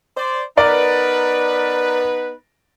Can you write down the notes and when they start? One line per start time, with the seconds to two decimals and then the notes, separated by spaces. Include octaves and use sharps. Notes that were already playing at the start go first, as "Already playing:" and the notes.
0.17 C5 D5
0.57 B3 D#4 A#4 B4 D5